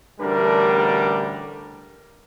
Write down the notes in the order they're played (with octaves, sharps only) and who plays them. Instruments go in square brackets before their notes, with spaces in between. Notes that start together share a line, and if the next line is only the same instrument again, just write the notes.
[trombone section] A1 D2 D3 G3 D4 A#4